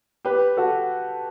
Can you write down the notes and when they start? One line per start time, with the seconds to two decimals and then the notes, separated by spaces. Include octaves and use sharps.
0.25 G4 B4
0.57 F#4 A4